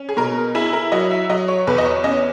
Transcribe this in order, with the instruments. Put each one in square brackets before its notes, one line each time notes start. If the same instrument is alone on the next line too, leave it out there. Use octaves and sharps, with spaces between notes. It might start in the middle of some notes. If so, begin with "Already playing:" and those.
Already playing: [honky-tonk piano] C#4
G#4
B2 A#4
E4 G#4
A#4
F#3 D#5
E5
F#3 D#5
C#5
E2 B4
D#5
C#5
C#4 D#5